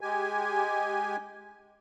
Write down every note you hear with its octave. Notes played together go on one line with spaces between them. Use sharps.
G#3 G4 G#5